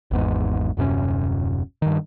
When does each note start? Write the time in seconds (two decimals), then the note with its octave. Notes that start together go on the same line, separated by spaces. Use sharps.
0.11 G#1 E2 G#2
0.77 D#1 F#2 C3 C#4
1.82 G2 D#3